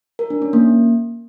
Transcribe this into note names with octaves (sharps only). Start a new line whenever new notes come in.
A#4
D4
C#4
A#3